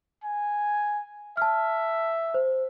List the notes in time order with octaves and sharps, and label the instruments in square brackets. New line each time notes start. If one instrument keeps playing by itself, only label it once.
[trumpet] G#5
[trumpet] E5 [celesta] A5 F6
[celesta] C5